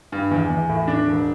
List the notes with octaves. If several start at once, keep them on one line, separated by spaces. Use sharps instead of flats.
G2
E2
E2
A2
D4
E1